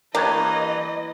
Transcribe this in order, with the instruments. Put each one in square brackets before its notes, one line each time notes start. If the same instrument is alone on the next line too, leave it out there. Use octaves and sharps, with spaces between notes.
[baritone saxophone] E3 [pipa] A#3 [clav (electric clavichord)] D4 G4 C#5 [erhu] D#5